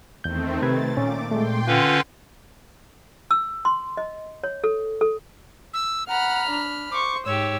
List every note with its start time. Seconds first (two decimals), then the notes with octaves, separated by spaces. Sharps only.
0.24 E2 D#3 A3 C4 G6
0.62 C3 B4 G#6 A6
0.97 A#2 C#4 D6
1.31 G#3 A3 G5 C6
1.67 D3 C#4 F4 B4
3.31 E6
3.65 C6
3.97 D#5
4.43 C#5
4.64 A4
5.01 A4
5.74 E6
6.09 F#5 A#5 B5 F6
6.49 D4
6.92 C5 C#6 D6
7.26 G#2 G4 C#5 E6